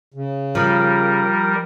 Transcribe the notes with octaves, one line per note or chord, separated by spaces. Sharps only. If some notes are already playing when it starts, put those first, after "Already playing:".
C#3
F3 G3 A#4